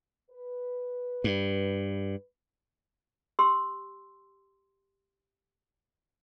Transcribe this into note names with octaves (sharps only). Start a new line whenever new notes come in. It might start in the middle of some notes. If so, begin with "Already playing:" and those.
B4
G2
G4 C6 E6